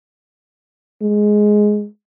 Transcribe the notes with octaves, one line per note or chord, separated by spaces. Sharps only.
G#3